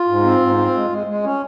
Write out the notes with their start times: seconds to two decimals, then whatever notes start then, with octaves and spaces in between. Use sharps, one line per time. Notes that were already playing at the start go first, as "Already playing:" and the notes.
Already playing: F4
0.08 G#2
0.24 C4
0.40 G#2
0.57 C4
0.74 G#3
0.90 G#3
1.07 G#3
1.23 C#4